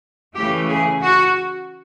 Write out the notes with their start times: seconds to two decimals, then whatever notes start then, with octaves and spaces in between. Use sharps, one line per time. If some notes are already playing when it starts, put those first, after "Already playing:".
0.36 C#3 E3 A3 G4
0.68 G#4
1.01 F#4